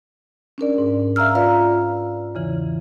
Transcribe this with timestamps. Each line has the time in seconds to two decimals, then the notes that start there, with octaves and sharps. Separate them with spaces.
0.58 C#4 D4 A#4 D5
0.78 G#2
1.16 E5 F5 A#5 E6 F6
1.35 F4 B4 D5 F5 A#5
2.35 E2 C#3 E3